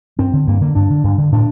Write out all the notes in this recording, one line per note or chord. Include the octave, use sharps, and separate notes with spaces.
G2 C4
D3
G2 A#3
D3 A#3
G2 D4
D3
G2
D3
A2 D4